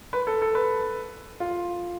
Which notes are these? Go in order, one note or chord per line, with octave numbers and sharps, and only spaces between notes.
B4
A4
A4
B4
F4